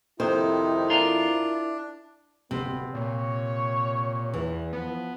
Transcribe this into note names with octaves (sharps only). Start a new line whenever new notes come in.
F2 C3 D#3 D#4 E4 C5
D4 F4 A#4
D1 C3 B3
A#2 C#5
E2 E3
F3 B3